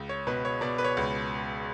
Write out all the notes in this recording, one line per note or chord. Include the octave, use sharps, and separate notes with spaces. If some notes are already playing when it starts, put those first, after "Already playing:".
Already playing: C#2
C#5
B2 B4
C#5
B2 D5
B4
C#5
C#2